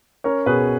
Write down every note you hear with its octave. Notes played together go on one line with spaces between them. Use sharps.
C#4 A#4 C#5
B2 G#4 B4